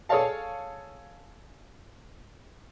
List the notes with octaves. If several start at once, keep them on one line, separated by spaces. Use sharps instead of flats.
G#4 A4 C#5 D5 F5 A5